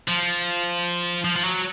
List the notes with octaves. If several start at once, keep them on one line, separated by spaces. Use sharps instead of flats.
F3
F3
F3
F#3